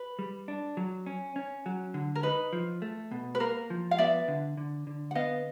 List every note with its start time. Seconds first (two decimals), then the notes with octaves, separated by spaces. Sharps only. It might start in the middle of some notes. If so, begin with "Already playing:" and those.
Already playing: B4
0.19 G3
0.48 D4
0.77 F#3
1.06 C#4
1.36 C#4
1.66 F#3
1.94 D3
2.15 A#4
2.23 D#4 B4
2.53 F3
2.82 A3
3.12 B2
3.35 B4
3.40 A#3 A#4
3.70 F3
3.91 F5
3.98 B3 D5 E5
4.28 D3
4.57 D3
4.87 D3
5.11 F#5
5.15 B3 D#5 F5